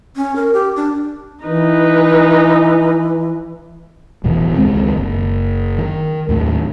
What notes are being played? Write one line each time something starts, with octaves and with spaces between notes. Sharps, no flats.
C#4
A#4
G4
D4
E3 D#4 B4
E1 A1 E2 B2
C#2 D#3 G#3 C4
F#1
D#3
D#2 A2